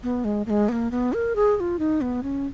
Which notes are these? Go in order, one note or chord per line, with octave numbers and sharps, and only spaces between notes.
B3
G#3
A#3
G#3
B3
A#3
B3
A#4
G#4
G#4
F4
D#4
B3
C#4